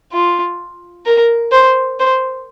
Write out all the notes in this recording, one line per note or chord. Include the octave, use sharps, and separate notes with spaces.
F4
A#4
C5
C5